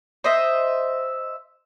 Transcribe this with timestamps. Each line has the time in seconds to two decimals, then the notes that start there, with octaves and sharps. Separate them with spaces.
0.24 C5 D#5 E5